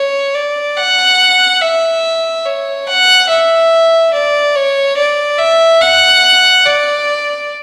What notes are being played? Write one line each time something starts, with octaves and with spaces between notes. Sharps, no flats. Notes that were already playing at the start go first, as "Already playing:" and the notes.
Already playing: C#5
D5
F#5
E5
C#5
F#5
E5
D5
C#5
D5
E5
F#5
D5